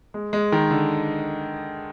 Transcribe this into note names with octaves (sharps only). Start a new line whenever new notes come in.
G#3
G#3
D#3
D3